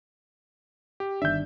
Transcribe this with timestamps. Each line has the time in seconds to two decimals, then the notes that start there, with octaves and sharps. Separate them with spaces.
1.00 G4
1.22 G1 D#3 D4 E5 G6